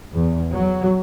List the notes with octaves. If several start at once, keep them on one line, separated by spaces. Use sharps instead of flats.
E2
F#3